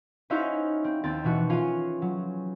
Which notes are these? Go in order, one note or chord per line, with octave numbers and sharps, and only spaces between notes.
C#4 D#4 E4 F#4 C5 F5
C4
D#2 C4 A6
B2 E3 F#4
C#4 F4 G#4 F5
F#3